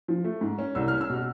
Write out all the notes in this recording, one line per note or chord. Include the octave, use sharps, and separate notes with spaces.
F3
A3
G#2
C#4
C2 E6
C#4 F6
E6
B2 F6